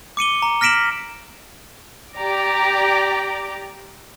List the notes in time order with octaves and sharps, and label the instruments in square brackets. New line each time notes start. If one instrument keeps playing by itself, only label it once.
[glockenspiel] D6 C#7 D#7 G7
A#5
F6 A#6 B6 D7 E7 F#7
[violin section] G4 D5 A#5 D6